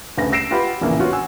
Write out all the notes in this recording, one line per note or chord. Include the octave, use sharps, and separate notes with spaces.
D2 C#3 A3 B4 A#6
E6 A#6 C7 D7 E7
F4 G4 B4 F#5 G5 B5
A#1 E2 A2 C#3 E3 A#3
B3 F4 F#4 C#5
F#5 G#5 E6